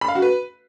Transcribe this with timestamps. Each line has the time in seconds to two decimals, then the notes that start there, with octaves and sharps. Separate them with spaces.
0.01 B5
0.08 F5
0.15 F#4
0.22 B4